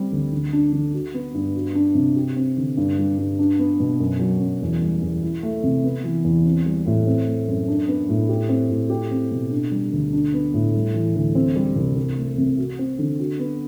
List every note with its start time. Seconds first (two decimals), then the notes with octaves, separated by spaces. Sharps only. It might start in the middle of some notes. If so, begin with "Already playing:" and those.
Already playing: G3 C4
0.12 D2
0.32 D3
0.53 D4
0.72 D3
0.94 F#4
1.14 B3
1.34 G2
1.55 F#4
1.75 D4
1.95 C3
2.16 G4
2.36 C4
2.57 D3
2.77 G2
2.98 G3
3.18 G2
3.39 D4
3.59 B3
3.80 B2
4.00 F#2
4.20 F#3
4.40 F#2
4.62 E2
4.82 G3
5.01 E2
5.22 E4
5.43 A3
5.63 C3
5.84 B3
6.04 E3
6.24 E2
6.45 C4
6.66 G3
6.86 A2
7.07 C4
7.27 A3
7.48 F#2
7.68 D4
7.88 B3
8.09 A2
8.29 G4
8.49 C4
8.70 A2
8.90 G4
9.11 C4
9.31 B2
9.51 D4
9.71 G3
9.92 D2
10.13 D4
10.34 B3
10.54 A2
10.74 G3
10.94 E3
11.16 D2
11.35 C4
11.56 G3
11.76 C2
11.96 C4
12.17 A3
12.38 C3
12.58 F#4
12.79 C4
12.99 D3
13.20 F#4
13.39 B3